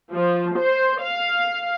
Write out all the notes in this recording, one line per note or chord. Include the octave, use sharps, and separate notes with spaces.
F3
C5
F5